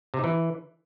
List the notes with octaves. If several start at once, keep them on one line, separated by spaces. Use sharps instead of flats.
C3
D#4
E3